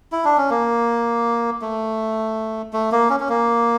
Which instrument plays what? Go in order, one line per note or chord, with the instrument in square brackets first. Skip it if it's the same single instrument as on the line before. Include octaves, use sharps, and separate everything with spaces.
[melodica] E4
D4
C#4
A#3
A3
A3
A#3
C#4
C#4
A#3